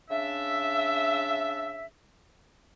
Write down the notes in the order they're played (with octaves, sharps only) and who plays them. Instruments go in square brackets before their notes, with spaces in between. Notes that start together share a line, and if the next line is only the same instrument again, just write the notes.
[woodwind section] C#3 D4 E5